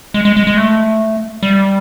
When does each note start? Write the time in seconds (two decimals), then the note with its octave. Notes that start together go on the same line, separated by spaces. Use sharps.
0.14 G#3
0.25 G#3
0.37 G#3
0.47 G#3
0.57 A3
1.43 G3